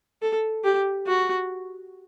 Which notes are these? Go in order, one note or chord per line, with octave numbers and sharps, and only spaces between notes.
A4
G4
F#4